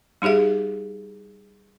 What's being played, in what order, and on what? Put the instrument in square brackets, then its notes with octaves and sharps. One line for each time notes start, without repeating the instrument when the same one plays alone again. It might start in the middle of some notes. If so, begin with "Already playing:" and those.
[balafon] G3 D#4 G4 G#4 E5